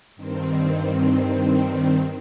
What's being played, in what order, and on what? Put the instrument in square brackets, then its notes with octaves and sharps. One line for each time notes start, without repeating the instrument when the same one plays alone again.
[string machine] G2 D#3 C4